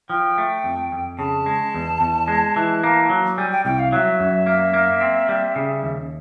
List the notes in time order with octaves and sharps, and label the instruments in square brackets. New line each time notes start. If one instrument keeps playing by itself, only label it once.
[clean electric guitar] F3 [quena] G5
[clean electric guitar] A3
F2
F2
[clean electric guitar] C#3 [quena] A5
[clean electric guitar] G#3
E2
E2
G#3
E3
A#3
F#3
[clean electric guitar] G3 [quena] G#5
[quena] G5
[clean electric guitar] C2 [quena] G5
[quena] F5
[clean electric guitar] F#3 [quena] E5 F5
[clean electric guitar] F#2
A#3
A#3
C4
G3
C#3
D#2